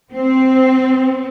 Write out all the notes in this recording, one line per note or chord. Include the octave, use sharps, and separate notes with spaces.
C4